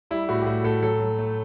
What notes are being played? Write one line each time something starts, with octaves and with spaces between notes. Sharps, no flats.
G3 E4
A2 F#4
G4
A2 F#4
A2 A4
F#3 A4
F#3
A3